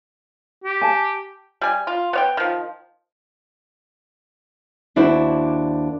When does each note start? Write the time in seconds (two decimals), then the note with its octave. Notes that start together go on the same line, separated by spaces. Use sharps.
0.64 G4
0.81 G#5 A5
1.61 G3 G#5
1.87 F4
2.13 B3 C#5 G5
2.37 D#3 F3
4.96 D#2 D4 E4 F#4 C5